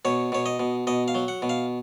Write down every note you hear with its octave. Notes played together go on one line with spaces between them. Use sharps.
B2 C#5
B2 C#5
D#5
B2
B2 D#5
F5
F#3
F#5
B2
F5